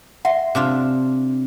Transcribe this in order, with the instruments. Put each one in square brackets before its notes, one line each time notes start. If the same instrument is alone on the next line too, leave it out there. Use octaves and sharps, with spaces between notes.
[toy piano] E5 F#5 [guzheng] C6
[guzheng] C3 D4 F4